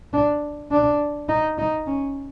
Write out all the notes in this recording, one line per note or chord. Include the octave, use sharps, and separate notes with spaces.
D4
D4
D#4
D#4
C#4